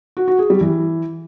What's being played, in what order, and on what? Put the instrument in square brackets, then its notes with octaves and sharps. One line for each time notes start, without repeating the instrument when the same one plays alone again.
[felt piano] F#4
F#4
G#4
G3
E3